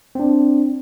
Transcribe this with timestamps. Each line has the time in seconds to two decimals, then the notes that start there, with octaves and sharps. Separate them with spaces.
0.15 C4 D4